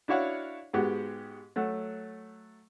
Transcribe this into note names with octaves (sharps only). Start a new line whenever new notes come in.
D4 E4 F#4 C#5 F5 F#5
G#2 G#3 B3 F#4 G4
F#3 A3